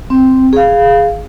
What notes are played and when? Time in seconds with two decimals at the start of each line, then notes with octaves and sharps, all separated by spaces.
0.10 C4
0.53 G#4 F5